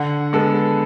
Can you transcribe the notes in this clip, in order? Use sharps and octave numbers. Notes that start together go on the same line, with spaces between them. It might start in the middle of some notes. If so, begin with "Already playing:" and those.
Already playing: D3 F#5
G#3 B3 A4